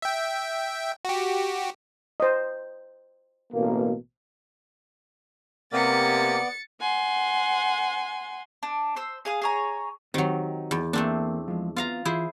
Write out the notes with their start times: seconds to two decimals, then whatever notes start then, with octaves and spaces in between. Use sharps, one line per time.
0.02 E5 G5
1.05 F#4 G4
2.20 C5 D#5
3.53 A1 B2 A#3
5.73 C3 A#3 B3 D5 A6 C#7
6.81 F#5 G#5 C6
8.63 D4
8.96 C5 E6
9.25 G#4 F5 D#6
9.42 G#4 C#5 A#5
10.14 D#3 F#3 C4 D#4 G4
10.71 E2
10.93 E3 A3 A#3 C4 D4
11.48 F3 G#3
11.76 B3 F4 F5 A#5
12.05 E3 E4 F4 G#4 C5 C6